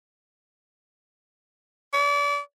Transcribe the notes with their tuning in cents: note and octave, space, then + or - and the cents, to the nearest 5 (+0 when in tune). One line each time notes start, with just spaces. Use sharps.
D5 -35